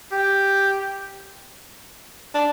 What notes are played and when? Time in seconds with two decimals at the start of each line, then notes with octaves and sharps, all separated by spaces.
0.12 G4
2.35 D4